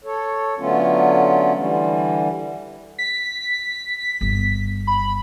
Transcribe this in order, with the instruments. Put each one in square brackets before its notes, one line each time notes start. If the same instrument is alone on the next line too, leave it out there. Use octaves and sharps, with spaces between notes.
[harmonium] A4 C#5
D3 F#3 A3 B3 C#4 F4
D3 E3 G3
[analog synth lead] B6
[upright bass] G1
[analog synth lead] B5